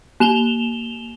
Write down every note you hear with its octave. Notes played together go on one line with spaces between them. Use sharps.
A#3 E7 F7 G7